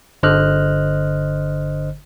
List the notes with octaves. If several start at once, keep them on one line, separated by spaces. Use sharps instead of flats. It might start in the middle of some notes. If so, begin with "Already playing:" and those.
G1 D3 C5 D#5 F6 F#6